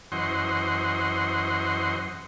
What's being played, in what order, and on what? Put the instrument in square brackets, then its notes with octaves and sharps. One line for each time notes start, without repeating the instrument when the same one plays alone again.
[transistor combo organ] F#2 E3 C5 D#5 F#5 C6